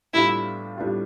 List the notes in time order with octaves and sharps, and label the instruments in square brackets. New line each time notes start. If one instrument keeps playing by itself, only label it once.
[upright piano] A2 G3 B3 D4 F4 [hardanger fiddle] E4
[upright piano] A2 G3 B3 D4 F4